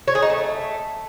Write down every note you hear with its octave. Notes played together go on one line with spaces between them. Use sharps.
C#5
G#4
D#4
A3